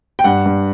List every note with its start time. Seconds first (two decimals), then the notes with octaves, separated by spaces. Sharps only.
0.19 G5
0.24 G2 F#5
0.46 G2